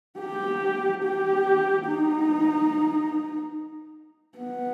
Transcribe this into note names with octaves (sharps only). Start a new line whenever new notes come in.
G4
G4
D#4
B3